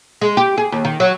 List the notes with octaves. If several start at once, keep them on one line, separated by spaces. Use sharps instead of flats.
G#3
G4
G#4
D#2
D#3
F#3